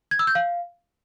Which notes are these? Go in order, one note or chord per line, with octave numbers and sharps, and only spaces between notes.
G#6
E6
G6
F5